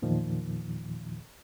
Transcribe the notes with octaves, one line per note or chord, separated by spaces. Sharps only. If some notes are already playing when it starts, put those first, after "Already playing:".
E2 A#2 D#3 F3